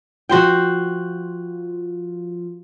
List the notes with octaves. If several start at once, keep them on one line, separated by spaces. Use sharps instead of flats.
F3 F4 F#4 C5 G5